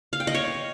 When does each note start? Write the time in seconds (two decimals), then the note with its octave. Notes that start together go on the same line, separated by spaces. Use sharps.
0.13 F5
0.20 G5
0.27 D#5
0.35 C#5